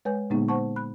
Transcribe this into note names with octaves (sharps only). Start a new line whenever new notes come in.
G#3 B4 C#5 G#5 G6
A#2 D3 G#3 A#3 B3 D#4
C5 F#5 A5 C#6
B5 F#6